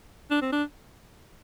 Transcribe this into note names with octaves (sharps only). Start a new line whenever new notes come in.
D4
C4
D4